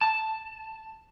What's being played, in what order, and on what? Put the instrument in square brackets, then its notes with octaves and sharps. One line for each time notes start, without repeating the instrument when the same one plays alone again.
[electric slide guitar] A5